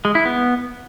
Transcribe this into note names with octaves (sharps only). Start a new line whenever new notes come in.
G#3
E4
B3